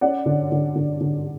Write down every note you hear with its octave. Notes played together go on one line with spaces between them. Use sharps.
C#4 D5 F#5
D3
D3
D3
D3